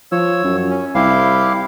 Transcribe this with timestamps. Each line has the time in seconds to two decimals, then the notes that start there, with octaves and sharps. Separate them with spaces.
0.12 F3 C#5 E6
0.44 F#2
0.70 C#4
0.95 C2 E4 G4 F5